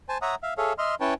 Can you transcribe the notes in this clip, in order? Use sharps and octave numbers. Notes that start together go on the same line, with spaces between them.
C5 G#5 A5
C#5 E5 F#5 A#5 D#6
E5 F5
G#4 A4 C#5 E5 F5
D#5 E5 C6 F6
C#4 E4 B4 C#5 G5 A5